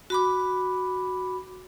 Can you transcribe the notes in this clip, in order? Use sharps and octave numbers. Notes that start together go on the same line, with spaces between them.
F#4 B5 D6